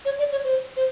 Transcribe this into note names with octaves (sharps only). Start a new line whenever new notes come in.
C#5
D5
C#5
C5
C5